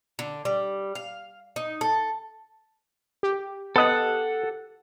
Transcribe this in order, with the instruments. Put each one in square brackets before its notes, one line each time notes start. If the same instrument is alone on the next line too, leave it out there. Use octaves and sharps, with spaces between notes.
[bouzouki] D3
G3
F5
D#4
A4
[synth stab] G4
[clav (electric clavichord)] B3 D#5 [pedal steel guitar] A4 F#5